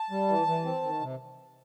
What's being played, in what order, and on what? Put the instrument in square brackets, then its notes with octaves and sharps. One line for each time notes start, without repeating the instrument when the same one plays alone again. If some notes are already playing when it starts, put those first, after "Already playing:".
Already playing: [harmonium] A5
G3
E3
E3
C4
D#3
C3